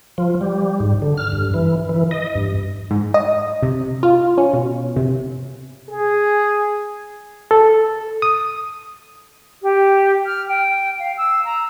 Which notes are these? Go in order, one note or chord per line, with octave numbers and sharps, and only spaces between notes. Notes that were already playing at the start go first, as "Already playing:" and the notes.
F3
G3
G#2
D3
F6
G2
E3
E3
D#5
G2
G#2
D#5
C3
F4
C#4
B2
C3
G#4
A4
D#6
G4
F6
G5
F5
E6
A#5